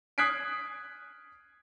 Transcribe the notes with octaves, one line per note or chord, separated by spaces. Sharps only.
D#6 F#6 G#6 B6 C7 D7